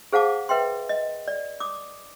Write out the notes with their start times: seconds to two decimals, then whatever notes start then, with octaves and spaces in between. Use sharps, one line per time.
0.13 G#4 C5 F5 F#5 A5 D6
0.49 B4 E5 G5 C6
0.89 D#5
1.28 D5
1.60 D6 D#6